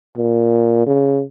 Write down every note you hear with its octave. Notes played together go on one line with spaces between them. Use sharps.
A#2
C#3